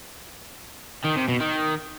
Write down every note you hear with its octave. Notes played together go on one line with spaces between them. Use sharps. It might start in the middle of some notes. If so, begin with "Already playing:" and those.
D#3
C3
B2
D#3